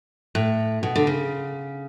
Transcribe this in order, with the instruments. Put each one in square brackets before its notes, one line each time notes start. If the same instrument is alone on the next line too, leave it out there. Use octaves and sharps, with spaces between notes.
[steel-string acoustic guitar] A2
B2
D3
C#3